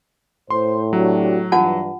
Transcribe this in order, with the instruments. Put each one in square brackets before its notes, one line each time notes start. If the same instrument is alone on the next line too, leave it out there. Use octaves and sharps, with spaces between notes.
[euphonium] A2 [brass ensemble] C5 [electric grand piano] C6
[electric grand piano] F#3 [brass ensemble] D4 F#4 G4
[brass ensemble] G2 E3 [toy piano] F4 F#5 A5